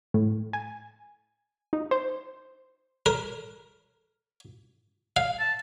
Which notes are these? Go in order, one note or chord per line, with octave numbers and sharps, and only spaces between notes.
A2
G#5
D#4
C5
A#4
F5
A5